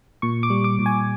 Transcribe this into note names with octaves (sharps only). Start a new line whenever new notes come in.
A#2 C#6
D6
G3
D6
A#2
G#5